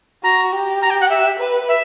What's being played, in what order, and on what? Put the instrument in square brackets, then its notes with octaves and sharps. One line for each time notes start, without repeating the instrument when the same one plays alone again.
[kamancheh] F#4 [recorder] A#5
[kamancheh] G4
[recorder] A#5
G5
F#5
E5
[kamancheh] B4
[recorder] E5